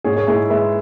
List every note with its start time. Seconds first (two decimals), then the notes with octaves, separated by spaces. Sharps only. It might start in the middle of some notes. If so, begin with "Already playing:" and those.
0.04 G#2 G#4 C#5
0.16 G#4 C#5
0.27 G#2 E4 G#4
0.50 G#3 B4 E5